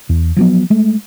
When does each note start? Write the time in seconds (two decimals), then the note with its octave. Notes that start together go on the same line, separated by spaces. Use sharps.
0.09 E2
0.37 F3 F#3 B3
0.70 G#3 A3